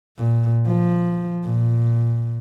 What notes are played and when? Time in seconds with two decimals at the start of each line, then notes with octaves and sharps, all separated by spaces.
0.18 A#2
0.67 F3
1.45 A#2